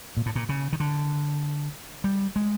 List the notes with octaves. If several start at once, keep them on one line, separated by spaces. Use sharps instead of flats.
A#2
A2
A#2
C#3
D#3
D3
G3
G#3